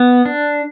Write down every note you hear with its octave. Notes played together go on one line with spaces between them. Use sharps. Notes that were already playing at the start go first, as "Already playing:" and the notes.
Already playing: B3
D4